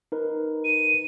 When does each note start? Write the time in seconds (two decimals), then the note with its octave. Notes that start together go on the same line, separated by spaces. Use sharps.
0.12 D#4 A#4 B4
0.65 D#7